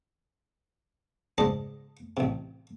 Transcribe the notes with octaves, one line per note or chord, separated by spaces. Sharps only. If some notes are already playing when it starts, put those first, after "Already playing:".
C#2 G#2 G#3 D5 D#5 A5
A1 C3